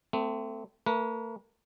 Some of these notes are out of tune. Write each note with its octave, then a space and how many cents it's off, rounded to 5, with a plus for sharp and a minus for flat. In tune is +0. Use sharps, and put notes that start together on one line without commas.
A3 +20 C4 -25
A3 +45 B4 -40